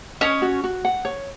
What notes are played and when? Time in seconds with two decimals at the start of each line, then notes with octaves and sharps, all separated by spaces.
0.21 C#4 C#5 D#5
0.42 F#4
0.64 F#4
0.85 F#5
1.05 C#5